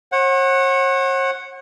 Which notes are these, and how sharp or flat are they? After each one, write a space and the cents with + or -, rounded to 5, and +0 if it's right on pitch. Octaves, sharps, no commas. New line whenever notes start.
C#5 -45 F#5 +0